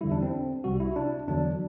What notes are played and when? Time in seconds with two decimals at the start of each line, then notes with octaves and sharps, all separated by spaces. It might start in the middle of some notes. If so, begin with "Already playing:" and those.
0.01 E2 D3 G3 E4
0.12 D4
0.22 C4
0.64 C2 C3 G3 F#4
0.80 E4
0.96 D4
1.28 E2 D3 F#3 D4